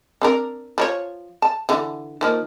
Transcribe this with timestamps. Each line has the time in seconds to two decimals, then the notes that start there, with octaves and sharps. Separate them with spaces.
0.22 C4 D4 A#4
0.78 F3 A#4 C#5
1.42 A5
1.69 D3 E3
2.21 D#3 F3 A#3